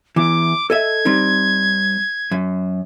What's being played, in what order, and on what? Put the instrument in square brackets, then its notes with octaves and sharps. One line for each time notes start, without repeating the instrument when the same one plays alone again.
[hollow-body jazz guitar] E2 E3 [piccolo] D6
[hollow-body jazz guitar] A4 D#5 E5 [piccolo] G#6
[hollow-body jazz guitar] G3 C4 D#4
F#2